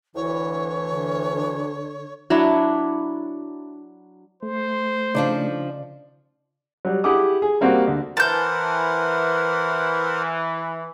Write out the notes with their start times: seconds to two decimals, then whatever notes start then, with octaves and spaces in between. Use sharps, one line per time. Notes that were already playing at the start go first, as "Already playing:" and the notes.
0.15 D2 E3 E4 C#5
0.89 D3
2.30 F#3 D4 E4
4.43 A3 C5
5.15 C#3 F3 D4 D#4 D5
6.85 F#3 G3
7.04 E4 G4 G#4 F#5 D6 D#6
7.42 G#4
7.61 G3 A#3 C4 F#4 A#4 F#5
7.87 D2
8.17 E3 A#4 C5 F#5 A5 G6